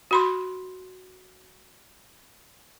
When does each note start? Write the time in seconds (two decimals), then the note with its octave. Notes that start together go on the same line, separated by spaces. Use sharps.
0.11 F#4 B5 C6